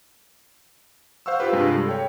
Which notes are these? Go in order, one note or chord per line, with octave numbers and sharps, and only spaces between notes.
C5 F5 F#5 C#6 E6
F4 G4 B4
G2 C3 G#3 F4
A4
C#5 G5